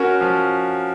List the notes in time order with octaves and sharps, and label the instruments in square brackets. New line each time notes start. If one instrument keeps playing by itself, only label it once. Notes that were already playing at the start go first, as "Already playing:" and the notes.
Already playing: [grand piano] C#4 F#4 A#4
F3